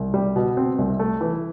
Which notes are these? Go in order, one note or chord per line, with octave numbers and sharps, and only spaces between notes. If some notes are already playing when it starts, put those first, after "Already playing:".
Already playing: C2
G3
B2
C4
C2
A3
E3